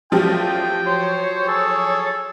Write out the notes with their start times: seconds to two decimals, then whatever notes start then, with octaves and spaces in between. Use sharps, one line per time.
0.12 E2 F3 F#3 A3 F4 G4 G5
0.86 C5 C#5
1.48 G#4 A4